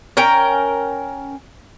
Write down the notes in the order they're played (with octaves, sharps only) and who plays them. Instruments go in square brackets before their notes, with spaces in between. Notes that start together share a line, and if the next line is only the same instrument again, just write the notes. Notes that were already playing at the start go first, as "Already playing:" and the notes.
[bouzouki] C#4 A#4 G5